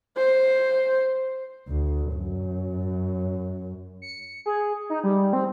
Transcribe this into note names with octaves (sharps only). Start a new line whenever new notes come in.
C5
D2
F#2
C#7
G#4
D#4
G3
C4